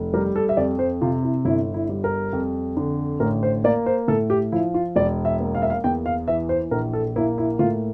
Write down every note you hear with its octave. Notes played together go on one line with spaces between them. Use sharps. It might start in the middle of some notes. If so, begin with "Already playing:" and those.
Already playing: F1
G3 A#4
A4
E5
F2 D5
C5
C3 F4
E4
G1 E4
E4
G3
A#4
F2
D3
A1 A#4
C5
A#3 D5
C5
A2 A4
G4
F3 E4
F4
E1 D5
E5
A#3
F5
E5
F5
E2 G5
F5
E3 E5
C5
A#1 A#4
A4
A#3 E4
E4
A2 F4